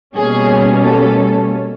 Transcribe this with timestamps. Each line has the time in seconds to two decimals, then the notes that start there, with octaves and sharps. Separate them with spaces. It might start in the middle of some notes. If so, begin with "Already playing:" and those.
0.16 B2 G3 A#3 C#4 G#4
0.82 A4